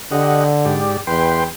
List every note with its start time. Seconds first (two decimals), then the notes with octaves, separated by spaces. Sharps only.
0.12 D3 G4 D#5 F#5
0.65 G#2 G4 D5
1.07 E2 B4 G5 C6